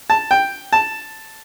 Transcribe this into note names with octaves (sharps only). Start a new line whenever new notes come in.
A5
G5
A5